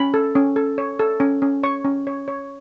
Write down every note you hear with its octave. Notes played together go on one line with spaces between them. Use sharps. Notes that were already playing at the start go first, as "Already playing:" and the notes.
Already playing: C#4 B5
A4
C#4
A4
C#5
A4
C#4
C#4
C#5 C#6
C#4
C#5
C#5